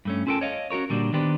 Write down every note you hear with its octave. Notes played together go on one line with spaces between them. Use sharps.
G2 A3 C#4
C#4 F4 A4 A#4 G5 A5
C#5 D#5 F5
C#4 F#4 G4 A#4 C#5
A#2 D3 G3 A#3 D4 F#4
D#3 B3 D4 G4 B4 C5